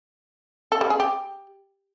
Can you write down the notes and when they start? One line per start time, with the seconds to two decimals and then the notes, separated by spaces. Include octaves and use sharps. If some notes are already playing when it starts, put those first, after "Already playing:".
0.72 A4
0.81 G3
0.90 G#4
1.00 G4